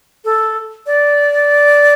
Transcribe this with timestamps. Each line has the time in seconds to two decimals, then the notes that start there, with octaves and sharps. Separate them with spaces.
0.25 A4
0.86 D5